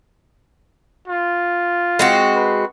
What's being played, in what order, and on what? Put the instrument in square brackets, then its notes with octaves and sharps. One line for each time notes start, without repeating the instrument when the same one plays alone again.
[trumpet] F4
[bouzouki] G#3 C4 F#4
[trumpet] B4